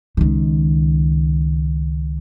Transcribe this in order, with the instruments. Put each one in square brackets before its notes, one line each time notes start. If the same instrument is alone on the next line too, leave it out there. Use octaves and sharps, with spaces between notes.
[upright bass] C#2 D#3